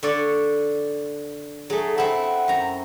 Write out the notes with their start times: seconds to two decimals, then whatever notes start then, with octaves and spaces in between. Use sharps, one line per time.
0.03 D3 C#5 D5
1.70 F#3 A3 G#4
1.98 C4 E4 F#5
2.48 F#2 A#5